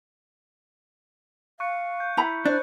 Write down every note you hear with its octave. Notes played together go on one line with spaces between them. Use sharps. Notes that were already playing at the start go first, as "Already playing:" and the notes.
F5 C#6 F#6 C#7
G6
E4 A#5 B5
D4 C5 F#6